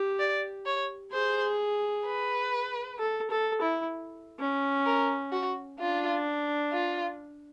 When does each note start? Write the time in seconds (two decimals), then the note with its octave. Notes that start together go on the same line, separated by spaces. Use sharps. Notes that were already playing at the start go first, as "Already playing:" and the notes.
Already playing: G4
0.19 D5
0.66 C#5
1.12 G#4 C5
2.06 B4
2.99 A4
3.31 A4
3.62 E4
4.40 C#4
4.86 A#4
5.32 F#4
5.80 D4 F4
6.72 F4